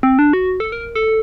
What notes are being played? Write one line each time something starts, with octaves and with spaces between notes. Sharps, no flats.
C4
D4
F#4
A4
A#4
A4